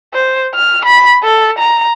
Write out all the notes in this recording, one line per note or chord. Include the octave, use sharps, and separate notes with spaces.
C5
F6
B5
A4
A#5